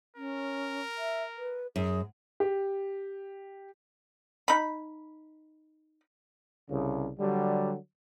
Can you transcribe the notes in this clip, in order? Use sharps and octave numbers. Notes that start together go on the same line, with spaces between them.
C#4 A#4
E5
B4
F#2 G#4
G4
D#4 B5
C2 C#3
D3 F#3 G3